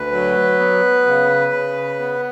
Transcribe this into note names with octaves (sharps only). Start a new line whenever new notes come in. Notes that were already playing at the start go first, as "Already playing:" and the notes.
Already playing: D2 B4
F#3
B3
C#3
C#3
B3